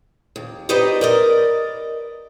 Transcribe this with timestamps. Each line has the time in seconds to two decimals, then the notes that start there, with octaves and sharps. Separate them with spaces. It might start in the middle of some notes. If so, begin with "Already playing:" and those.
0.36 D#2
0.69 D#4 G4 B4 C5 D5 D#5
1.01 A#4 D5 D#5